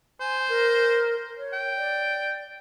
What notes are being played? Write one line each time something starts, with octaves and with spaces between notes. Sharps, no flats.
C5 G#5
A#4
C#5
G5
D5